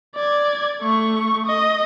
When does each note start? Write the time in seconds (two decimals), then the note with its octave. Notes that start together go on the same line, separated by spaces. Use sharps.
0.16 D5 G#6
0.82 A3 C#6
1.46 D#5